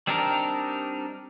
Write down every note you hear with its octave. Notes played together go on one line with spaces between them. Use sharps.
G3 C4 D4 D#4 A#4